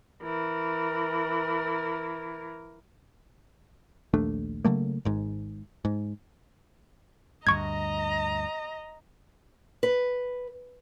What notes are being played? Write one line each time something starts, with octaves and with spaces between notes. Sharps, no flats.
E3 A#4
A#1 D#2 A3 D4
C#3 F#3 A3 A#3
G#1 G#2
G#2
D2 G2 D#5 A#5 C#6 G#6
B4